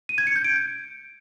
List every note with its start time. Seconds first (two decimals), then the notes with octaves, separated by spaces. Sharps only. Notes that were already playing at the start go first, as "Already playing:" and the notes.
0.09 D#7
0.18 G#6
0.27 C#7
0.36 G6
0.44 D7